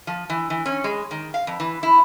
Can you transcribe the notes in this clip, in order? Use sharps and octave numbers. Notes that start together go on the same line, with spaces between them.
F3
E3
E3
C#4
G#3
D#3
F5
F2
E3
E4